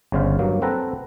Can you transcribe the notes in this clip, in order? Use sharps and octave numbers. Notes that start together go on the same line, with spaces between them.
G1 C#3 C5 F5
G2 F#3 A#3
C4 A4 B4 F#5 A#5